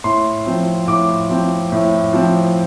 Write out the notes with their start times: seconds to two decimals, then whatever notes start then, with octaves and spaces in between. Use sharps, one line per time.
0.04 A2 C6
0.46 F3 C4
0.87 A2 D6
1.30 F3 C4
1.72 A2
2.13 F3 C4